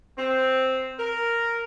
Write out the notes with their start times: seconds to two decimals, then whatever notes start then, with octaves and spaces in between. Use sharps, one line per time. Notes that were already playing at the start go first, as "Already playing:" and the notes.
0.17 C4
0.99 A#4